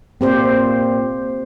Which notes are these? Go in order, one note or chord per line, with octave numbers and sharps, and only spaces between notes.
A#2 C4 G4 C5